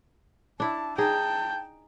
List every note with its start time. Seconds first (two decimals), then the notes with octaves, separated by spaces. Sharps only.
0.60 D4 E4 A5
0.98 D#4 G#4 G5 A5